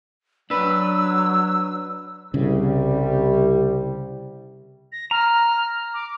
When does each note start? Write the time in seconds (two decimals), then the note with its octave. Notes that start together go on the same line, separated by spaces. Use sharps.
0.50 F#3 D4 B4 E6
2.34 C2 C#3 G3
4.92 A#6
5.11 A#5 F6
5.93 D6